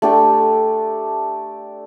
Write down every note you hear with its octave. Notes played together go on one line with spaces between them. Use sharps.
A3 D4 G4 A4